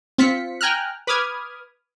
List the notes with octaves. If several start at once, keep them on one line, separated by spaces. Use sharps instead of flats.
C4 F4 B6 C#7
G5 G#5 A#5 F6 F#6
B4 B5 D6 D#6 F6 G#6